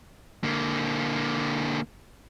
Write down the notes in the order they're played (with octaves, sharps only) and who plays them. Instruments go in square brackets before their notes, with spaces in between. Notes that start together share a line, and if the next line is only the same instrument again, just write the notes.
[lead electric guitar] D3 A#3